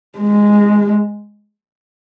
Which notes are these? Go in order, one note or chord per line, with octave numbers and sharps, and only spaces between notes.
G#3